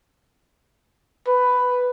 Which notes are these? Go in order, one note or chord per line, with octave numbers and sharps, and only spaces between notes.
B4